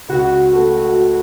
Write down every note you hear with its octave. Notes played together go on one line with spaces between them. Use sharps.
C#2 F#4
A3